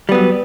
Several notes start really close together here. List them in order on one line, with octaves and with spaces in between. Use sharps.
G3 B3 F#3